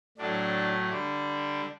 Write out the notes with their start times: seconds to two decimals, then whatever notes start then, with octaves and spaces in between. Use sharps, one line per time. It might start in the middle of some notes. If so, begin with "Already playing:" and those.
0.17 A2 F#3 A3 D4
0.90 D3 G3 D4